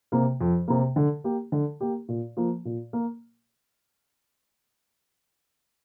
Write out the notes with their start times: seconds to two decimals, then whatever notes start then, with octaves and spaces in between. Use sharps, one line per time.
0.12 C3 A#3
0.41 F2
0.68 C3 A#3
0.96 D3
1.24 A#3 G4
1.52 D3
1.81 A#3 G4
2.08 A#2
2.37 F3 A#3
2.65 A#2
2.93 A#3